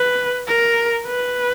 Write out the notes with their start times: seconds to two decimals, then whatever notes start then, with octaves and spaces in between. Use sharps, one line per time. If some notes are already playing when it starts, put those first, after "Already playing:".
Already playing: B4
0.47 A#4
1.06 B4